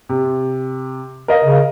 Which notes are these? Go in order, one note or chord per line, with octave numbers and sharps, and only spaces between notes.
C3
A#4 D#5 F5
C#3